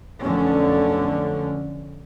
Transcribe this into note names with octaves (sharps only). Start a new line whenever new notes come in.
F1 B1 D3 C#4